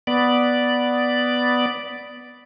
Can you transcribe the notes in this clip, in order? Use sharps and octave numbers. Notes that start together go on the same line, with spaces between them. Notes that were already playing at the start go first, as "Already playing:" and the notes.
B3 D5